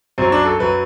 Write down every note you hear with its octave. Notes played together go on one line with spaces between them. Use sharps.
F#2 F#3 C4
D4
A4
F#2 F#3 B4